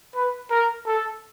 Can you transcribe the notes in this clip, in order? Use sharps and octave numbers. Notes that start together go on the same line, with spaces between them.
B4
A#4
A4